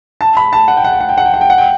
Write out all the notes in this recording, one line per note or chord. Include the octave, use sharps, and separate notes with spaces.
A5
B5
A5
F#5
G5
F#5
G5
F#5
G5
F#5
G5
F#5
G5
F#5
G5